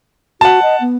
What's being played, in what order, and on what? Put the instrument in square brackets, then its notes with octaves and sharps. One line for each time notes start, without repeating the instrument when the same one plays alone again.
[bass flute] F#4 [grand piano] F#5 A5
[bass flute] D#5
B3